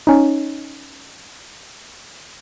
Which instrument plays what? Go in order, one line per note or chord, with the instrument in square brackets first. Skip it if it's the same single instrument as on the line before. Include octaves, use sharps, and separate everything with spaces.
[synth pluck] C#4 D#4